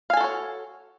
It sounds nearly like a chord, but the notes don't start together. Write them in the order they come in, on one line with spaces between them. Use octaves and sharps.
F5 G#5 A4 F#4 C#5